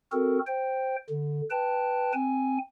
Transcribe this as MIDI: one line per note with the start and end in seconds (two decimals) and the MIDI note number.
0.12 0.39 60
0.12 0.39 66
0.12 0.39 69
0.12 0.39 70
0.47 0.96 72
0.47 0.96 79
1.09 1.41 50
1.51 2.12 71
1.51 2.12 79
1.51 2.12 81
2.13 2.58 60
2.13 2.58 80